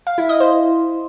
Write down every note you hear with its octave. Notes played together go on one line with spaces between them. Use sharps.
F5
E4
D#5
C5